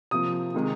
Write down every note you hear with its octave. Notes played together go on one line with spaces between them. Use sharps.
C3 F3 A#3 D#6
C3 D#3 G#3